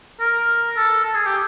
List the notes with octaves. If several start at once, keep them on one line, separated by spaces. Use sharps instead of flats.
A#4
A4
A4
G#4
G4